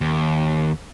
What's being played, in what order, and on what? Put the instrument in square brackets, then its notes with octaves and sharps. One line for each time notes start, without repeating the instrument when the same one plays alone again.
[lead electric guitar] D#2